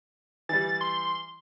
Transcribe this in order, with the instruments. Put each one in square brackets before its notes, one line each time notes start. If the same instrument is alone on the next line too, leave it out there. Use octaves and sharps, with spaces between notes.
[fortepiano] E3 G3 [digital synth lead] A6
[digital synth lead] C6